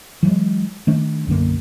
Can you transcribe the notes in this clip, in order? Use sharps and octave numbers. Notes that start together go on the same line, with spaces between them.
E3 F#3 G#3
D#3 A3 D4
B1 F#2 D3 A#3